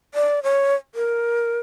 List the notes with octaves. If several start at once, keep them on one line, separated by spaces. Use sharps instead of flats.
D5
C#5
A#4